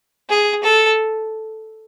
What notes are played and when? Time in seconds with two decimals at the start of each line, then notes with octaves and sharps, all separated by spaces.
0.29 G#4
0.64 A4